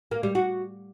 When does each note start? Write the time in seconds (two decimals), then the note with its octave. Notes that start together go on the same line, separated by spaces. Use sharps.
0.11 A#3
0.23 G3
0.35 F#4